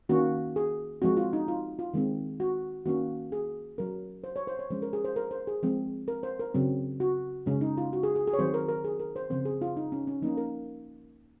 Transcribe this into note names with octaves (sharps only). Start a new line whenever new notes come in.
D#3 A#3 C#4 F#4
G#4
F3 G#3 C4 F#4
F4
D#4
F4
F4
D#3 G#3 C4
F#4
D#3 A#3 C#4 F#4
G#4
F#3 C#4 A#4
C5
C#5
C5
C#5
F3 G#3 C#4 C5
A#4
G#4
C5
A#4
C5
G#4
F3 G#3 C4
A#4
C5
A#4
C#3 F#3 C4
F#4
C#3 G#3 C#4
D#4
F4
F#4
G#4
G#4
G#4
C#5
D#3 F#3 C4 C5
A#4
A#4
G#4
A#4
C5
C#3 F3 C4 C5
G#4
F4
D#4
C#4
C#4
F3 A#3 C#4 D#4
A#4